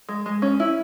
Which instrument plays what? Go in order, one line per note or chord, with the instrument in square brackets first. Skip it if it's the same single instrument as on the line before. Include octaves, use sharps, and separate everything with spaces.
[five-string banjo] G#3
G#3
C#4
E4